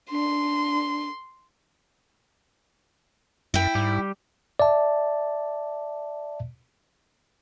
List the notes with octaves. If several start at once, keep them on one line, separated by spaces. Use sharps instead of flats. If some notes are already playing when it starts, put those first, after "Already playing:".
D4 C6
F#2 E4 G5
G#2 G3 G4
D5 E5 A5